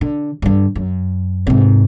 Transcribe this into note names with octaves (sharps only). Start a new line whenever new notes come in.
D3
G2 D3
F#2
G#2 C3